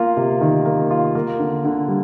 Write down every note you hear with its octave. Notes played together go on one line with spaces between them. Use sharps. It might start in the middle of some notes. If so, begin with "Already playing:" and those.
Already playing: A#3 F4
C3
D#3
A#3
F4
A#3
D3
D3
G3